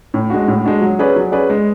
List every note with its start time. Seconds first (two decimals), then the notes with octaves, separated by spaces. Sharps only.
0.14 A2
0.30 G#3 D4 F#4
0.48 A2
0.64 G#3 D4 F#4
0.82 F#3
0.99 C#4 G#4 B4 D5
1.16 F#3
1.32 C#4 G#4 B4 D5
1.50 G#3